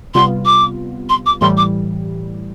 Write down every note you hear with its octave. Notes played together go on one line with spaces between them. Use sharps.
C3 G3 B3 F4 C6
D6
C6
D6
A2 E3 G3 C6
D6